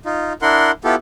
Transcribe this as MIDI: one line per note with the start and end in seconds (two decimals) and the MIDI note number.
0.05 0.33 63
0.05 0.33 65
0.42 0.71 62
0.42 0.71 64
0.42 0.71 70
0.42 0.71 78
0.42 0.71 84
0.84 0.95 59
0.84 0.95 64
0.84 0.95 65
0.84 0.95 67
0.84 0.95 69